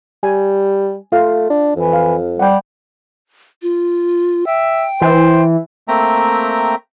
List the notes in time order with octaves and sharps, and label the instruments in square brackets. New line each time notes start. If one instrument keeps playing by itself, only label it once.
[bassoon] G3 [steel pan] G#5
[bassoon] A3 [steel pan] F4 F5
[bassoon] D4
[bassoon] F2 [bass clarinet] E3
[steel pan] F5
[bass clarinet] G3 [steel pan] F#5 G5
[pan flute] F4
[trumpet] E5 [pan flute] G5
[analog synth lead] E3 [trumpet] C5
[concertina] A3 A#3 C4 E5 G5 A#5